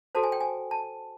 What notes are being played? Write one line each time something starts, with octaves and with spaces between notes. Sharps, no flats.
F#4 A4 C5 A5
G#5
G5
G#5
A5